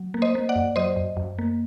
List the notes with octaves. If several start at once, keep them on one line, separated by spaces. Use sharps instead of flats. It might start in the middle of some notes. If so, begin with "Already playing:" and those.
Already playing: F#3
A#3
C5 D#5
A#3
D5 F#5
F#2
F#3 C5 D#5
F#2
F#2
A#3